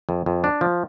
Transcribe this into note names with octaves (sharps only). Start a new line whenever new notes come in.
F2
F2
D4
F3